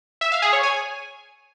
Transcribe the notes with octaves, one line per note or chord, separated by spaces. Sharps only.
E5
F5
G#4
C#5
G#5